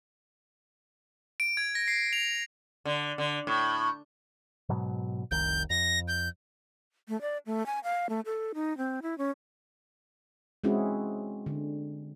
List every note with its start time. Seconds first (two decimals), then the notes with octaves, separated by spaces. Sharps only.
1.40 D7
1.57 G#6
1.75 A#6
1.88 C7
2.13 F7
2.85 D3
3.18 D3
3.47 A2
4.69 G#2 B2 F#3
5.31 F1 C2 D#3 G6
5.70 F2 A#6
6.08 G6
7.09 A3
7.21 D5
7.46 A3
7.66 G#5
7.84 F5
8.09 A3
8.26 A4
8.54 D#4
8.78 C4
9.02 E4
9.18 C#4
10.64 G#3 C4 C#4 E4 F#4 G#4
11.46 D3